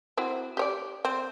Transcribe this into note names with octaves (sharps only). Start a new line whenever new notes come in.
C4 E4 F#4
G4 C#5 D5
C4